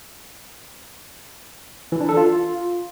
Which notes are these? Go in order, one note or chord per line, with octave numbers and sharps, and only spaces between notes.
E3
D4
A4
F4